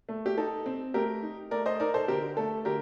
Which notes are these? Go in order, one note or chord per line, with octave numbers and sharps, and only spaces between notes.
A3
G4
D#4 A4
C4
A3 G4 A#4
D#4
A3 A#4 D5
C5 D#5
D#4 A#4 D5
A4 C5
D3 G4 A#4
A3 A4
D3 G4 A#4